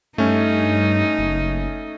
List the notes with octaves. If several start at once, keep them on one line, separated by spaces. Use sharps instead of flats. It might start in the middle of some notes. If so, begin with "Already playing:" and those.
G2 A3 C#4 D#4
F#1